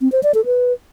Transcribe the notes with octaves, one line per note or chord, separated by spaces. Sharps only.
C4
C5
D5
A4
B4